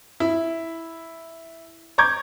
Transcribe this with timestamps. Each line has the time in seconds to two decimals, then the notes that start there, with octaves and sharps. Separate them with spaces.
0.20 E4
1.98 A#5 C#6 D6 G6 G#6